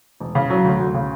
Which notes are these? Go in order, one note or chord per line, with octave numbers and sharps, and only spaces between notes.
E1
C#3
F#3
D2
D2
C#3